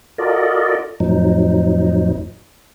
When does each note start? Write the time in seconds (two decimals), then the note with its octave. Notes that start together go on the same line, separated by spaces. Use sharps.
0.18 F4 F#4 A4 A#4 D5 D#5
1.00 F2 A2 F3 F#3 D#4